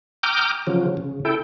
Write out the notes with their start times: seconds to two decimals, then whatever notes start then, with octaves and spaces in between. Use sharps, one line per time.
0.23 G5 A#5 D6 D#6 F6 G6
0.67 C#3 F3 F#3
0.97 C#3
1.25 E4 A4 G5